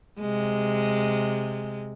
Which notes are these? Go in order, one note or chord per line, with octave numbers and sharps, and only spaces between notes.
C3 G#3